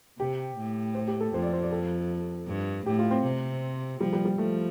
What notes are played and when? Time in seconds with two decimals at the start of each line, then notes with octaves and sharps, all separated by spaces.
0.19 C3 G4
0.57 A2
0.95 C5
1.07 G4
1.20 A4
1.33 F2 C5
1.43 D5
1.53 C5
1.62 D5
1.72 A4
2.48 G2
2.86 A2 G4
2.99 F4
3.11 C4
3.24 C3
4.00 F3 G3
4.13 G3
4.25 G3
4.38 F3 A3